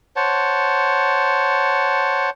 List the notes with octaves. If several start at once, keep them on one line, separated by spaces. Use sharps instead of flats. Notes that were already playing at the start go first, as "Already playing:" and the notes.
C5 C#5 F#5 A5